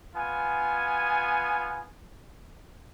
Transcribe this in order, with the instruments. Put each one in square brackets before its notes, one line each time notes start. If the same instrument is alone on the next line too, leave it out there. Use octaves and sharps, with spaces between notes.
[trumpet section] B3 F4 G#5